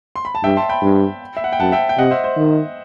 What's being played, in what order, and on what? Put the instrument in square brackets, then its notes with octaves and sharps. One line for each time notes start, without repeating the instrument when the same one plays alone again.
[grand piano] C6
B5
A5
[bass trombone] G2 [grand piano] E5 G5
[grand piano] A5 C6
G5 B5
[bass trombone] G2
[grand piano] E5
F#5
G5
[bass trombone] F#2 [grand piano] F#5 A5
[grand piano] E5 G5
G5
[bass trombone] C3 [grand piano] D#5 F#5
[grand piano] C5 E5
C5
[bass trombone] D#3